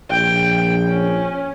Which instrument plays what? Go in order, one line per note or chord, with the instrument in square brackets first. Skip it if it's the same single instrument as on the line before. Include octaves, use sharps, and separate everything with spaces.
[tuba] A#1 [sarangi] G5
[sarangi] C#4